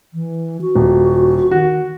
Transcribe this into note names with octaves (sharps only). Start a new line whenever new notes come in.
E3
F#4
D#1
D#3 F#4